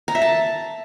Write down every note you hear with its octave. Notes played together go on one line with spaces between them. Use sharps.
A#5
E5
A5